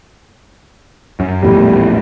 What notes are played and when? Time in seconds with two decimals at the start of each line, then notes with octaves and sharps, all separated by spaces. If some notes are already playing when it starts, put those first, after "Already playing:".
1.20 F#2
1.43 A#1 E2 A2 G3